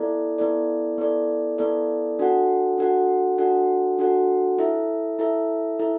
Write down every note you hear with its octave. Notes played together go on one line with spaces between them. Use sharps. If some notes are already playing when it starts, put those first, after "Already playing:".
Already playing: B3 E4 A4 D5
B3 E4 A4 D5
B3 E4 A4 D5
B3 E4 A4 D5
D4 F#4 A4 F#5
D4 F#4 A4 F#5
D4 F#4 A4 F#5
D4 F#4 A4 F#5
E4 A4 E5
E4 A4 E5
E4 A4 E5